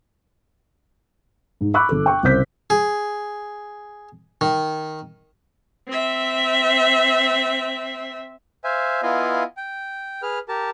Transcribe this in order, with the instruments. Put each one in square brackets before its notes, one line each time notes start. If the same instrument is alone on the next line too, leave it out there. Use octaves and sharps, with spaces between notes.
[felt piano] G#2
B5 C#6 D6 E6 F#6
G1 A4
G5 C#6
C2 C#3 C5 G6 B6
[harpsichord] G#4
D#3
[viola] C4 E5
[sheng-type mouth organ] C5 E5 F5 G#5
B3 E4 F4 D#5 F5 G#5
G5
G#4 B4 F6
G4 A#4 A5